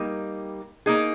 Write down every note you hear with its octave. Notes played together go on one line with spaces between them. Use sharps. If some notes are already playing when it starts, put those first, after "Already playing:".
Already playing: G3 A#3 D#4
A#3 D#4 G#4